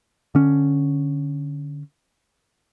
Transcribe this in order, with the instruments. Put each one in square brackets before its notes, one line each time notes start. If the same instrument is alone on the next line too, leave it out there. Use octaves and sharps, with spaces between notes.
[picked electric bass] D3 C#4